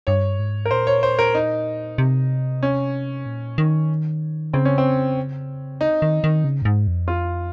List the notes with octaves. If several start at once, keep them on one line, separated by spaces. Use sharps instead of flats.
G2 C#5
G#2
A#4
A#2 C5
C#5
C5
A#4
D#4
C3
C#4
A#2
D#3
C#3 C4
C#4
C4
D#4
D#3
D#3
C#3
G2
G#2
F2
F4